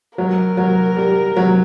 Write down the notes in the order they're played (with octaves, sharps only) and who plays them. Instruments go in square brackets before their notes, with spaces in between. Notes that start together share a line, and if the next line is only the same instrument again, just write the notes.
[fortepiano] F#3 [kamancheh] A#4
[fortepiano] F#3
G3
F#3